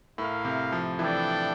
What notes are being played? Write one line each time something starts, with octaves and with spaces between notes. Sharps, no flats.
A2 E4 A#4 F5
C3
F3
E3 D4 A4 D5 G5